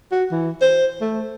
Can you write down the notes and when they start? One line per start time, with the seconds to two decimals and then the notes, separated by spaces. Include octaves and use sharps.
0.11 F#4
0.31 E3
0.61 C5
1.01 A3